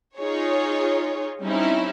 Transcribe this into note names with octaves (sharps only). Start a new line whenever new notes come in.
D#4 F4 G#4 C#5
G3 C4 C#4 D#4 E4